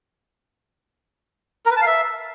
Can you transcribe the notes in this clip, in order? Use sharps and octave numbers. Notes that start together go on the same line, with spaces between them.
A#4
B4
A5
F5
E5